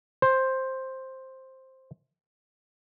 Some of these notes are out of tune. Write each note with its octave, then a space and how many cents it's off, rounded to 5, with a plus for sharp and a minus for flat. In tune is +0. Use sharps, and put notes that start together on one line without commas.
C5 +10